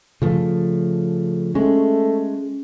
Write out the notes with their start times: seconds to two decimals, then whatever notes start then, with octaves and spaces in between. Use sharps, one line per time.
0.22 C#3 F3 A3
1.55 G#3 A3 C#4